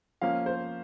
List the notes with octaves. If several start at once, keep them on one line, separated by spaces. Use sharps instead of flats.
F3 A#3 C#4 F5
C5